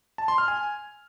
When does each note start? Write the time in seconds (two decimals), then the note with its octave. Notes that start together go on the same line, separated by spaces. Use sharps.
0.18 A5
0.28 C6
0.38 F6
0.48 G#5